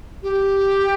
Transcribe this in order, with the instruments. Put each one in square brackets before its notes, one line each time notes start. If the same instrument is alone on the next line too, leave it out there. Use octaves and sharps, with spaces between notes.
[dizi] G4